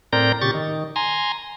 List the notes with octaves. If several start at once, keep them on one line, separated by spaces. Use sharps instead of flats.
A2 C4 A#4 D5 A#5 G6
A#2 C#3 G4 C#6 A6
D#3
G#5 A#5 C6